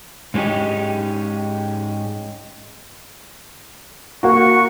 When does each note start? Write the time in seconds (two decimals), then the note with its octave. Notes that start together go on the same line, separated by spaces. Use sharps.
0.34 G#2 G#3 C#4 D#4 G4
4.23 A#3 F#4 C#6